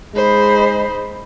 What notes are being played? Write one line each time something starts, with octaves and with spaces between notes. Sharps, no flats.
G#3 D#4 C5 B5